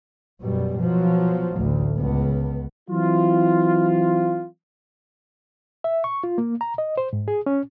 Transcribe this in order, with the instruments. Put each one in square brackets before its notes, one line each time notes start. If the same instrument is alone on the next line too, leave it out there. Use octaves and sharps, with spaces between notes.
[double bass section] F#2 B2 G3
B2 F3 F#3
A1 D2
C#2 B3
[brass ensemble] E3 F#3 C4 E4 F4
[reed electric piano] E5
C#6
F4
A#3
A#5
D#5
C5
G#2
G#4
C#4